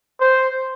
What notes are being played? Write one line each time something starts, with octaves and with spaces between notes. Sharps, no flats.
C5